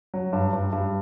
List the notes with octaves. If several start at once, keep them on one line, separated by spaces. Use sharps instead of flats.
F#3
G2
G2
G2